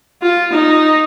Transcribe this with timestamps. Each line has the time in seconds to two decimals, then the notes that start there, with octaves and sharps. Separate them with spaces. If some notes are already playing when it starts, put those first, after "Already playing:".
0.22 F4
0.53 D#4